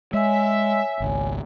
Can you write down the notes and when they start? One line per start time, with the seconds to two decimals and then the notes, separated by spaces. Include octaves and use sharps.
0.13 G#3 C#5 E5 G#5
1.00 G#1 C#2